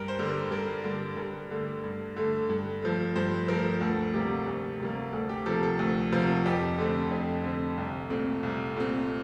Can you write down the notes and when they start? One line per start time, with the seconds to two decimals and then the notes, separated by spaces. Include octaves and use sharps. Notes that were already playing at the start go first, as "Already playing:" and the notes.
Already playing: G2 A#4
0.08 C5
0.19 D3 G3
0.29 A#4
0.51 G2 A#4
0.84 D3 G3
1.17 G2 A#4
1.50 D3 A3
1.84 G2
2.16 D3 A3
2.49 G2
2.82 F3 A3
3.16 G2 C5
3.48 F3 A3 A#4
3.81 D2 A4
4.14 C3 G3 A#3 G4
4.47 D2
4.80 C3 G3 A#3
5.13 D2 A4
5.29 G4
5.46 C3 F3 A#3 A4
5.63 A4
5.79 D2
6.12 C3 F3 A#3
6.46 F2 G4
6.78 D3 A3 C4
7.11 F2
7.44 D3 A3 C4
7.77 C2
8.10 A#2 A3 C4
8.43 C2
8.76 A#2 A3 C4